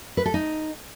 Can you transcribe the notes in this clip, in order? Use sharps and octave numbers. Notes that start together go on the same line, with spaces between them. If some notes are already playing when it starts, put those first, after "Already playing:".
B4
A4
D#4